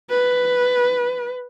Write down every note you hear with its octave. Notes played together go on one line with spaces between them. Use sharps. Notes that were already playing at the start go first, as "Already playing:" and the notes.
B4